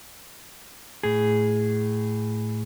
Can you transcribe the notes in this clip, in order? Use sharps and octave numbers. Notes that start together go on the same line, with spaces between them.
A2 G#4